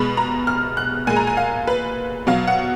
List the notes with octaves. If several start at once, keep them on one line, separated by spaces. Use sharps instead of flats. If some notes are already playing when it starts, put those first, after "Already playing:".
Already playing: B2 G#3 B5
A#5
F6
F#6
A#2 G#3 G#5
A#5
G#5
F5
B4
B2 F#3 F5
F#5